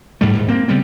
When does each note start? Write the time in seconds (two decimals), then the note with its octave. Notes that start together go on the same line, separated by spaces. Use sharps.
0.21 B1 G#2 G3 A3
0.33 D#1 G#2
0.48 A#3 C4
0.68 C#3 G3 B3 C4